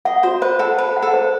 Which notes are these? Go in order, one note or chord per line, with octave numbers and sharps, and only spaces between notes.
D#5 F#5
F#4 C5
B4 C5
A4 F#5
B4 C5
F#5
A4
C5